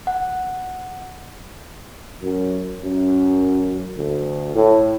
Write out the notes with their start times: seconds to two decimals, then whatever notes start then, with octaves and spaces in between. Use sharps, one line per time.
0.07 F#5
2.22 F#2
2.82 F#2
3.96 D2
4.54 A2